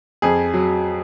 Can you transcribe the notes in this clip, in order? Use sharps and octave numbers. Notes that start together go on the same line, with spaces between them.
F2 G#4
F#3